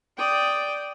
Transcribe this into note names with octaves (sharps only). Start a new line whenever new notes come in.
D5 G5 D#6